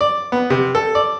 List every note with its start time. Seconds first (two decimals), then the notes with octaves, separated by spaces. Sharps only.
0.01 D5
0.32 B3
0.50 C3
0.75 A4
0.95 D5